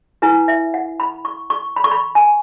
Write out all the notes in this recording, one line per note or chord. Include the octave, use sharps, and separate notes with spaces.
E4 B4 G#5
E5
F#5
B5
C#6
C#6
B5
C#6
B5
G#5